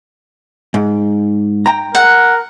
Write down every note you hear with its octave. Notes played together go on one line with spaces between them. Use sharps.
G#2
G5 A#5
A#4 F#5